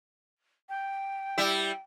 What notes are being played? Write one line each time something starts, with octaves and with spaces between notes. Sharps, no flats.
G5
G3 E4 E5